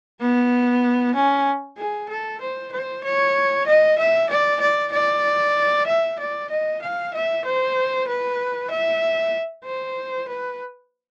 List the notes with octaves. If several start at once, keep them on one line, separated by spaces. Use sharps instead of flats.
B3
C#4
G#4
A4
C5
C5
C#5
D#5
E5
D5
D5
D5
E5
D5
D#5
F5
E5
C5
B4
E5
C5
B4